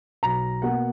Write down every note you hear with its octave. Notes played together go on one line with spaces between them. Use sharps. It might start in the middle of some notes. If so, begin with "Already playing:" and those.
B1 A#5
B2 A#3 F#5